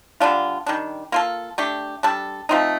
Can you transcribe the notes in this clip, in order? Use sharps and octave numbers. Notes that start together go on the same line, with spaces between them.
D3 G3 D4 F4
D#3 G3 D4
A#3 F4 A4
A3 D4 G4
G3 D4 A4
F3 A3 C4 D#4